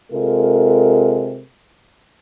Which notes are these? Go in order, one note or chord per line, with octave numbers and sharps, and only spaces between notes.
C3 G#3 F4 A4 A#4